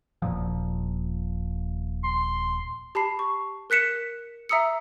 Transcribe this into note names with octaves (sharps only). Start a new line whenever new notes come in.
D#1 A#2 F3
C6
G4 A5 B5 C7
C#6
A#4 F#6 B6 C#7 E7
E5 A#5 D#6 E6 C#7